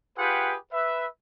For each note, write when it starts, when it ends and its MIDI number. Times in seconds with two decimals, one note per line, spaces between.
0.18 0.56 65
0.18 0.56 67
0.18 0.56 68
0.18 0.56 71
0.18 0.56 78
0.18 0.56 79
0.72 1.06 71
0.72 1.06 76